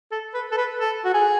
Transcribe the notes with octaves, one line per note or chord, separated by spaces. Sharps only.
A4
B4
A4
B4
A4
F#4
G#4